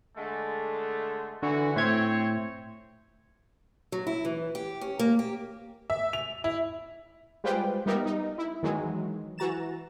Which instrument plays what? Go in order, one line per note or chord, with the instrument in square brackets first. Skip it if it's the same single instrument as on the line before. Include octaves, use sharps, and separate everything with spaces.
[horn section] D3 G#3 A3
[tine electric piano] D3 [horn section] E3 F#4
[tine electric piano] A2 E5 G#6 [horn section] C4 C5 C#5
[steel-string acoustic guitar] F#3
E4
E3
G4
C#4
A#3
G4
[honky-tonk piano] E5
F7
E4
[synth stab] G3 G#3 F4 B4 C5 G5
G3 B3 D#4 G4 A#4 E5
D#4
E4
D#3 E3 F#3 G#3
E3 F#4 A#5 A6 E7